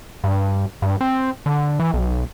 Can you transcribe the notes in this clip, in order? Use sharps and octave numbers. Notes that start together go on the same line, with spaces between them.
G2
G2
C4
D3
E3
B1